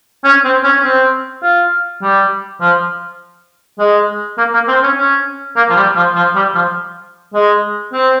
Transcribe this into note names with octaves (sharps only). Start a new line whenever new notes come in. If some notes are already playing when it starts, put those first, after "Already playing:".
C#4
C4
C#4
C#4
C4
F4
G3
F3
G#3
A#3
A#3
C4
C#4
C#4
A#3
F3
G3
F3
F3
G3
F3
G#3
C4